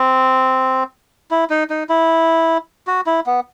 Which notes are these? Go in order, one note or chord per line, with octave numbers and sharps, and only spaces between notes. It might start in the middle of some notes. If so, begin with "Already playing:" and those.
Already playing: C4
E4
D#4
D#4
E4
F#4
E4
B3